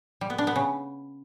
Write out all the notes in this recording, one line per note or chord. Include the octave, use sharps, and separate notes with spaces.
G3
B3
D4
B3
C#3